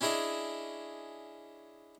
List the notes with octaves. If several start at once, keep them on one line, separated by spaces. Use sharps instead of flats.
C#4 D4 E4 G#4 D#5